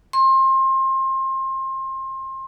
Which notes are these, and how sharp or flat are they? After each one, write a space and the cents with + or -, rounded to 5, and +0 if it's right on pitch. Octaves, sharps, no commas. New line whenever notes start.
C6 +30